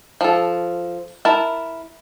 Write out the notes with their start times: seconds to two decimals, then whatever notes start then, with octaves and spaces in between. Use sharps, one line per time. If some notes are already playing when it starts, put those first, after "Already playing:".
0.21 F3 A4
1.25 E4 A#4 A5